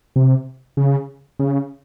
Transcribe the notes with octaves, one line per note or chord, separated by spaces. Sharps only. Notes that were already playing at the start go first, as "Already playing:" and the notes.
C3
C#3
C#3